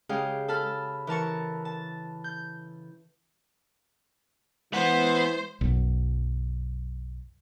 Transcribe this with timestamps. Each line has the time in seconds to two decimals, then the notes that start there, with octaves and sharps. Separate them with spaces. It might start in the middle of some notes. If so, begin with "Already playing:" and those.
0.09 C#3 G#3 G4 G#4 F5 G5
0.48 A4 A5 B5 F6
1.07 E3 A#4 A5 C#6
1.65 A5
2.24 G6
4.73 E3 G#3 B3 C5 F#5
5.61 B1 F#2